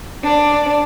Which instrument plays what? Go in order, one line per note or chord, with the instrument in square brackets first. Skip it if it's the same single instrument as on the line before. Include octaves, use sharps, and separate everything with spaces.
[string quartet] D4 D5